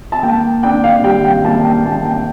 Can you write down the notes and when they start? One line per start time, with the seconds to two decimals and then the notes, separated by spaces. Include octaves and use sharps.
0.12 A5
0.23 A#3 G5
0.63 D4 G5
0.84 F5
1.04 G3 G5
1.25 G5
1.44 A#3 A5
1.64 G5
1.85 A#3 A5
2.05 G5